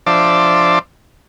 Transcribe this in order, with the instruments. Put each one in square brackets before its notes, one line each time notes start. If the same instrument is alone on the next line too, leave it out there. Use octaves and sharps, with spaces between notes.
[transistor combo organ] F3 D4 C5 D5 E5 A5